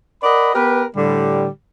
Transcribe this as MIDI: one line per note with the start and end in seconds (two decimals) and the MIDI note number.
0.22 0.52 70
0.22 0.52 74
0.22 0.52 75
0.22 0.52 78
0.22 0.52 83
0.54 0.84 59
0.54 0.84 67
0.54 0.84 70
0.54 0.84 71
0.95 1.47 45
0.95 1.47 50
0.95 1.47 55